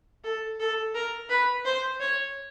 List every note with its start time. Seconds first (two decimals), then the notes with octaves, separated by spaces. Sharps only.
0.24 A4
0.60 A4
0.94 A#4
1.30 B4
1.65 C5
2.00 C#5